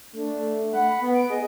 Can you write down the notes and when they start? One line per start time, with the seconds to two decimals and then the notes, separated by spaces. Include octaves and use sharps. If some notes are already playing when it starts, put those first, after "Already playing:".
0.13 A3 D4
0.74 F#5 B5
1.01 B3
1.14 D7
1.30 G#4 D#5